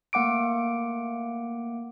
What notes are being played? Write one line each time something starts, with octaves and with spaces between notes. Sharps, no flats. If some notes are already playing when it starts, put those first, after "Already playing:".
A3 A#3 F#5 D6 D7